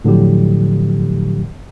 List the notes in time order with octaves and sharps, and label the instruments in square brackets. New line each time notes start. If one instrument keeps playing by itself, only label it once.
[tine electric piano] A2 D3 F3 F#3 G4